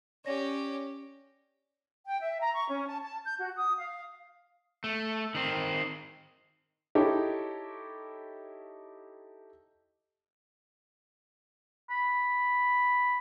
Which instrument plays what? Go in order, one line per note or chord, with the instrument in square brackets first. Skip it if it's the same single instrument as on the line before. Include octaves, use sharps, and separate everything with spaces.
[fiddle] C#4 G4 [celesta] C#5 D5 A#6
[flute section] G5
E5
A#5
C#6
C#4
A5
A5
G6
F#4
D#6
F5
[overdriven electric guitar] A3
D#3 C4
[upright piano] D#4 E4 G4 A4 C#5
[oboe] B5